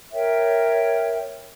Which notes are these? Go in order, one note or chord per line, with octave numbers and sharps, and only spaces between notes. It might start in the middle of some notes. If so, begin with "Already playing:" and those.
A#4 C#5 E5 G5